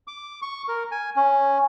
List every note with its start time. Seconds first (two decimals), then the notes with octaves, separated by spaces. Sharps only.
0.07 D6
0.42 C#6
0.68 A#4
0.91 G#5
1.16 C#4